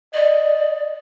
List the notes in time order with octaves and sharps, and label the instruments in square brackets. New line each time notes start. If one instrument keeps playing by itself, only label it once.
[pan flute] D5 [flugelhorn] D#5